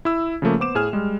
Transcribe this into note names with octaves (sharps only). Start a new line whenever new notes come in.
E4 E6
C#3 F3 A3 A#3
B3 C5 D6 E7
A2 G#4 G#5 F6
G3 G#3